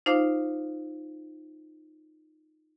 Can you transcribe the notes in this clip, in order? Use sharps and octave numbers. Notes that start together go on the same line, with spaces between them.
D#4 F4 C5 F5 D6